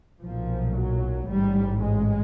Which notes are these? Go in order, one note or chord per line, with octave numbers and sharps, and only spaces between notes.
B1 A#2 F3
F#3
A1 G#2 G3
G#3